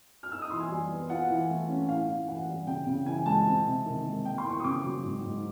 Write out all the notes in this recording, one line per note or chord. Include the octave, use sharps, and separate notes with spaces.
F6
D#4 E6
D#6
E3 C6
G#5
G3
B3
F4 F#5
E3
A3
C#4
A2 F5
A2
E3 F#5
G3
C#3 G5
C#3
E3 G#5
G#3 A5
C4
C3
D#3
G#3
A#3 G5
C6
E2
C#6
D#6
C#3 D6
F#3
G#2
G#2